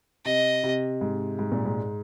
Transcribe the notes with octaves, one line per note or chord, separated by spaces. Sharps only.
C3 D#5
C3
G#2
G#2
A#2
G#2